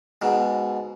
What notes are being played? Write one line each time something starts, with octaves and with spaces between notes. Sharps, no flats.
G#2 B2